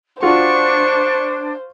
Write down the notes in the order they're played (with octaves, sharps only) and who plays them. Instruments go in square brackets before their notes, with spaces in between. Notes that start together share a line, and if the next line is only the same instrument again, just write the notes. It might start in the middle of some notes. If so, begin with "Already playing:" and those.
[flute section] D4 [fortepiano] F4 F#4 [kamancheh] C5 [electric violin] C#6